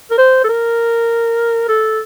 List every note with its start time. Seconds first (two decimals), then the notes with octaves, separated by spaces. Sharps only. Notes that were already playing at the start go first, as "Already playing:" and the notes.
0.11 A#4
0.18 C5
0.44 A4
0.49 A#4
1.68 A4